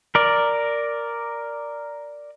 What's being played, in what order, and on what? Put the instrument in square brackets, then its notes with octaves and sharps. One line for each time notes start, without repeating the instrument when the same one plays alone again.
[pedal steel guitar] A#4 D5